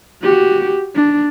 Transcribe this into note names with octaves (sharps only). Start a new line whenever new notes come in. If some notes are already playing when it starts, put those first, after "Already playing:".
F#4 G4
D4